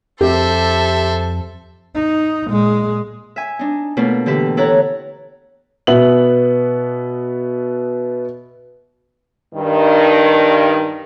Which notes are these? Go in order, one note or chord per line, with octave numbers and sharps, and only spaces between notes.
F2 G4 A4 C5 E5
D#4
A#2 G#3
E5 G#5
D4 D#4
B2 A3 A#3 F4 D5
D3 E3 G4 E5
E4 A4 C#5 F#5 A#5
B2 B3 E5 F#7
G2 D#3